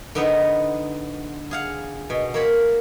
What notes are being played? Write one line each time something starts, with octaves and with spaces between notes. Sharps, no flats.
D3 B3 D#4
G#4 F5 F#5
B2
A#3 C#5 B5